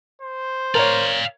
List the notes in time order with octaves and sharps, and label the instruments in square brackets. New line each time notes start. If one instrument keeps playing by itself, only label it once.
[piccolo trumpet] C5
[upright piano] A#4 C#5 [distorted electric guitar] D5 F5